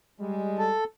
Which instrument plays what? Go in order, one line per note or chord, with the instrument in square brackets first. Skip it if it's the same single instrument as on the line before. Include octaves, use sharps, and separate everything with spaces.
[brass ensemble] G3 G#3
[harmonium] A4